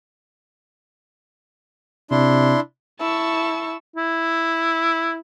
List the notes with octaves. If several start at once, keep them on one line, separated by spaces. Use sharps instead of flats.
C3 D4 E4 C6
E4 A5 C#6 E6
E4